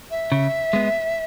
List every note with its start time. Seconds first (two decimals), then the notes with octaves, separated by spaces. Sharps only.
0.11 E5
0.32 C#3
0.73 G#3 B3